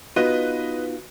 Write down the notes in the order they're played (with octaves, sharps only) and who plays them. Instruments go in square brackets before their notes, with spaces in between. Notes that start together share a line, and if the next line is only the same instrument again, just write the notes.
[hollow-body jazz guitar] B3 D#4 F4 [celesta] F#4 F#6 D#7 [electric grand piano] B4 D#5